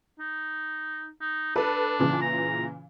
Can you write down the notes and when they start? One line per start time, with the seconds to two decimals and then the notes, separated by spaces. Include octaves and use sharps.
0.19 D#4
1.21 D#4
1.56 D4 A4 B4
1.99 A#2 C#3 E3
2.22 A#5